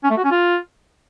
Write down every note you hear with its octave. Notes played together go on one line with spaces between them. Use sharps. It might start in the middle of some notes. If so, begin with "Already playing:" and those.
C#4
A3
F#4
C#4
F4